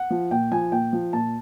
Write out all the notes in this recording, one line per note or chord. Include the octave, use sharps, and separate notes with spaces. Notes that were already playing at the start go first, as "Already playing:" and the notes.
Already playing: F#5
F3
A#2 G5
F3 G#5
A#2 G5
F3
A#2 A5